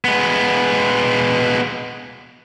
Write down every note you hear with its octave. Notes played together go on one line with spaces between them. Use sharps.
G#3 B3